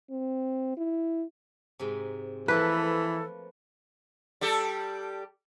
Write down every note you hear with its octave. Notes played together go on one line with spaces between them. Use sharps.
C4
E4
G#2 C3
E3 F3 A3 A#3 A4 B4
G3 G4 A4